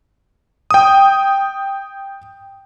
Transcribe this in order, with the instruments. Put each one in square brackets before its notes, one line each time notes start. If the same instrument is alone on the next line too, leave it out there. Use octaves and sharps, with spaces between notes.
[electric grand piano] G5 D#6